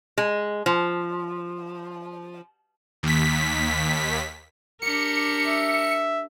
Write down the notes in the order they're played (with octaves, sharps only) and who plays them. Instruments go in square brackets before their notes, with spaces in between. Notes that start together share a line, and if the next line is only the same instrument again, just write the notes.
[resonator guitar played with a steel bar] G#3
F3
[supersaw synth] D#2 B6
[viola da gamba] D4 G4 A#4 [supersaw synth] C#7
[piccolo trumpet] E5